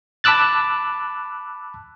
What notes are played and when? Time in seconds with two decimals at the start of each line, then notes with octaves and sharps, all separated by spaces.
0.24 A5 B5 D6 E6 F#6 A6